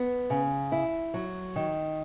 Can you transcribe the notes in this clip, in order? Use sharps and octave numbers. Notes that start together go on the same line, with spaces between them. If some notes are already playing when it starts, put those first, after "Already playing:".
Already playing: B3
C#3
E4
F#3
D#3